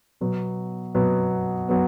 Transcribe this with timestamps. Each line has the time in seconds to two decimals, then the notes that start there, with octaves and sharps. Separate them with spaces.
0.21 B2 F#3 B3
0.95 B2 F#3 B3
1.69 F#3 B3